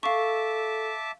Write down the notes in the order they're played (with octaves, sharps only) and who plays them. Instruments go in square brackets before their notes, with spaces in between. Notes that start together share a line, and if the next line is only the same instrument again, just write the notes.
[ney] A4 [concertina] E5 A5 D6 [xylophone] F5 C#6